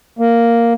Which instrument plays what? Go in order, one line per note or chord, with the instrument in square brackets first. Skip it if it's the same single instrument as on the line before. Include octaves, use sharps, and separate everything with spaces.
[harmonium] A#3